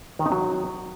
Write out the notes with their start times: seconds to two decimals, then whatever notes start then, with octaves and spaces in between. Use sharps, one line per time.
0.19 D#3
0.26 D#4
0.32 F#3